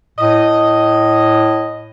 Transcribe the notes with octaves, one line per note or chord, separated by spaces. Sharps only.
A2 D#5